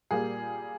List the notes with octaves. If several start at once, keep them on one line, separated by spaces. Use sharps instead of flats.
A#2 G3 A#3 G#4